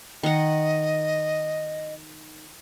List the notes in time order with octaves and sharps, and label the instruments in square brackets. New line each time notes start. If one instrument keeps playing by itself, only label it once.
[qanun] D#3 F#5 [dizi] D#5